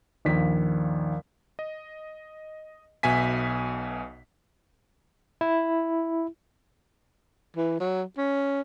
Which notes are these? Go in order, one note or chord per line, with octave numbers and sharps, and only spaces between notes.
A#1 D#2 B6
D#5
B1 B2 E5 G#5 B6
E4
E3
F#3
C#4